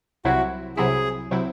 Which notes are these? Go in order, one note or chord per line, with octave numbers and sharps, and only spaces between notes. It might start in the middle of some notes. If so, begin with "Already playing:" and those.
C2 C3 F#3 C4 E4 F#4
C2 C3 F#3 C4 E4 G#4
C3 F#3 C4 E4